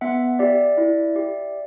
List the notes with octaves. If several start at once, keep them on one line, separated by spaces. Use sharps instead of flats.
B3 E5 F#5
G4 D5 E5
E4
G4